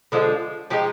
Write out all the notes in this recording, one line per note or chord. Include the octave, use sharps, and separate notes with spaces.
D3 F3 G#3 D4
F3 G#3 D#4 G4